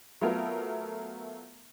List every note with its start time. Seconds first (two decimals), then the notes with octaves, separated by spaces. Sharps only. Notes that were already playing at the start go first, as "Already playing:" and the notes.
0.21 F#3 A3 B3 F4 A4 A#4